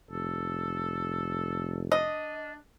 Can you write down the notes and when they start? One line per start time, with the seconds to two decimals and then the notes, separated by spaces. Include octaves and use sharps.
0.11 F1 A4
1.92 D4 D#5